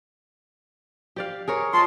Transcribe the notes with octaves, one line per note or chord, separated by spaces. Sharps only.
G4 D5 F5
G#4 A#4 C#5
F4 D#5 A5 C6